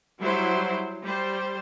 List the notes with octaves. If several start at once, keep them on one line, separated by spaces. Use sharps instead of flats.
F#3 G3 E4 C5
G3 C5